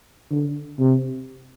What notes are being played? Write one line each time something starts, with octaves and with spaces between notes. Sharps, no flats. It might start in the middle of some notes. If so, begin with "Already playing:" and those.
D3
C3